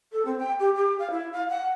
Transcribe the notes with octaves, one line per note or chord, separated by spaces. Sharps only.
A4
C4
G5
G4
G4
F5
E4
F5
F#5